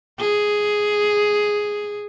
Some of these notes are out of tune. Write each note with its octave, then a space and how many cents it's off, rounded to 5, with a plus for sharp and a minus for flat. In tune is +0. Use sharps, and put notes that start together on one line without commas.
G#4 +0